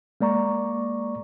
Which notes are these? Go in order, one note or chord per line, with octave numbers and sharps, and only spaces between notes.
G#3 A#3 D5 A#5 C#6